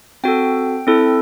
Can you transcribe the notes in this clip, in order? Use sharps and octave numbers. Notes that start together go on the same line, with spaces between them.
C4 F#4 A4 G5
C4 E4 A4